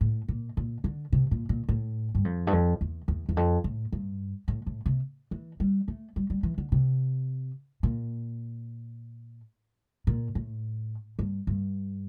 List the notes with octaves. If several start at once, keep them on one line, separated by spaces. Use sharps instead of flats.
A2
A#2
A#2
D3
C3
A#2
A#2
A2
G2
F2
G2
F2
E2
E2
E2
F2
A2
G2
A2
A2
C3
E3
G3
A3
G3
G3
E3
D3
C3
A#2
A#2
A2
G2
G2